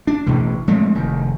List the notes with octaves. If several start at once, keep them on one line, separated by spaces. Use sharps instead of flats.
D4
A1 B2 E3
F3 G#3 A3 C4
F1 D#3